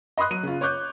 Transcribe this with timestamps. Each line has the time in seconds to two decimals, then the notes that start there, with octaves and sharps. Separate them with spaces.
0.18 D#5 B5 C6 D#6 F#6
0.31 F#3 D#7
0.43 C#3 F4
0.61 C#5 C#6 D6 F#6 G6